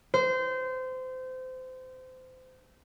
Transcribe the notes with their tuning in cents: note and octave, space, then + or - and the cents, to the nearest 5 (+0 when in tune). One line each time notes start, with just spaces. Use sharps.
C5 -25